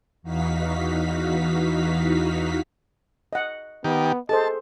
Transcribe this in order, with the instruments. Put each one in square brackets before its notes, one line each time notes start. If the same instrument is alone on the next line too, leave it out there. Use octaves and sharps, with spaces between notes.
[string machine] E2 E3 D#4 F#4 F5 B6
[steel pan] D#5 F#5
[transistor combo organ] D#3 G4 [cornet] B3
[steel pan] G#4 A4 C5 [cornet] D#5 [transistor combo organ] A5